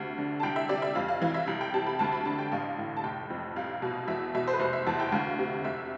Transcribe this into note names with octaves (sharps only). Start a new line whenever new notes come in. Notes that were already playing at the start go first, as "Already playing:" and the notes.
Already playing: D2 C3
D3
A5
C2 G5
E5
C3 D5
E5
F2 F5
F5
E3 F5
E5
C2
G5
C3 A5
B5
D2 A5
B5
D3 A5
G5
A1 F5
A2
A5
F1 G5
F2
C2 F5
B2
E2 E5
B2 E5
C5
B4
F1 C5
E5
E2 A5
G5
D2 F5
C3
F1 E5